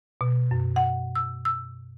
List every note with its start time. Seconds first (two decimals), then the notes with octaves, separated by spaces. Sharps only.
0.21 B2
0.51 F#2
0.76 F#5
1.15 E6
1.45 E6